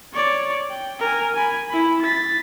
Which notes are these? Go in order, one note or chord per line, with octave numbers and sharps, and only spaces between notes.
C#5 D5
G5
A#4 G#5
G#5 B5
E4 B5
A6 B6